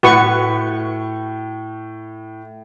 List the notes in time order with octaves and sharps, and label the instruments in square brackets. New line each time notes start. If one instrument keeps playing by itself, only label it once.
[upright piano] A2 [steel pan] F#4 B4 C#6